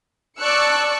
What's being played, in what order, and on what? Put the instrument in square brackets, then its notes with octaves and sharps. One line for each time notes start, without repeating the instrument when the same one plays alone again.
[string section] D5 A5 C#6 E6 F#6 C#7